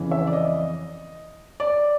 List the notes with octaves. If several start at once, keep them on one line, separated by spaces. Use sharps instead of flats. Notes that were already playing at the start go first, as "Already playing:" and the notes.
Already playing: F2 C#3 E3
E5
D5
D#5
D5